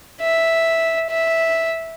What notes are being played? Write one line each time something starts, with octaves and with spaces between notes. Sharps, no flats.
E5
E5